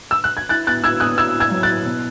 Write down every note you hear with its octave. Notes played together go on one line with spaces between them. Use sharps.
E6
F#6
G#6
E4 F#6 A6
B3 F#6 A6
E4 E6 G#6
B3 D#6 F#6
E4 E6 G#6
E4
E6 G#6
F#3
F#6 A6
E4
B2